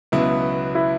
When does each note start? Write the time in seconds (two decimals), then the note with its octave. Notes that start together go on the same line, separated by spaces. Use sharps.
0.12 C#2 B2 F#3 B3 E4
0.75 E4